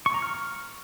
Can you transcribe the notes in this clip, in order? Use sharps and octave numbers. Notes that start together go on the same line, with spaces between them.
C#6
A#5
F6